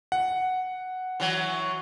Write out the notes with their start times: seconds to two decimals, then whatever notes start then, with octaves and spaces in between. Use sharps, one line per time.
0.12 F#5
1.20 E3 F#3